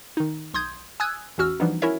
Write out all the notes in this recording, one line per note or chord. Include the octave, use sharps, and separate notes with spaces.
D#3 D#4
B1 C6 D#6 G6 G#6
G#5 D#6 E6 F#6 G#6
A1 E2 C#4 F#4 E6 F6
E3 F3 G3 B3 D4 D#4
C#4 E4 F#4 A#4 C#5 E5